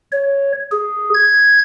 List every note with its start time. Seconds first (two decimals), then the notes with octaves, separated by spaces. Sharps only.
0.12 C#5
0.71 G#4
1.14 G#6